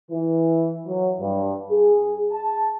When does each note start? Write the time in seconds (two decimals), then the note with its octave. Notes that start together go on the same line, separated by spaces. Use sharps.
0.11 E3
0.86 F#3
1.21 G2
1.71 G#4
2.32 A5